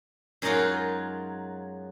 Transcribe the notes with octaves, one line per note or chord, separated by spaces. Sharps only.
F#2 F#3 G#3 D#4 F4 F#4